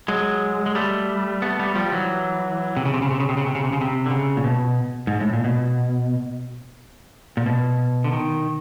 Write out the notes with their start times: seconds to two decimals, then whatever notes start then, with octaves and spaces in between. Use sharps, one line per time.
0.08 F#3 G#3
0.66 G#3
0.75 G3 A3
1.42 A3 B3
1.59 G3 A3
1.75 F3 G3
1.92 E3 F#3
2.77 C3
2.85 C#3
2.94 C3
3.02 C#3
3.11 C3
3.20 C#3
3.29 C3
3.37 C#3
3.46 C3
3.55 C#3
3.64 C3
3.73 C#3
3.81 C3
4.06 D3
4.11 C#3
4.37 A#2
4.44 B2
5.07 G#2
5.20 A2
5.33 A#2
5.44 B2
7.37 A#2
7.46 B2
8.04 D3
8.12 D#3